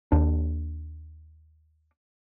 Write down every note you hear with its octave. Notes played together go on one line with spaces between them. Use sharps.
D#2 D4